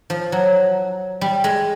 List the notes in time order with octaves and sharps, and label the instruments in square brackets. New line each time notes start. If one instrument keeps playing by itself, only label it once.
[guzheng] F3
F#3
G3
G#3